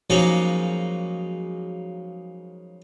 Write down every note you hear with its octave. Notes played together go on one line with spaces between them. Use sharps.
C#3 F3 F#3 G#3 A#3 D#4